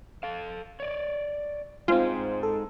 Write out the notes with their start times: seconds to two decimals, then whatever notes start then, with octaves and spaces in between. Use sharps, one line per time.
0.23 A4 F5
0.80 C#5 D5
1.88 G#3 C4 D#4 F4 G#4 C5 G#5
2.43 A4